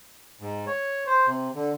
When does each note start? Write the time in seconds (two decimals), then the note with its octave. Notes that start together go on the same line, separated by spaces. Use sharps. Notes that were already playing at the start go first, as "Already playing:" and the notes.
0.41 G#2
0.67 C#5
1.07 C5
1.27 C3
1.55 D3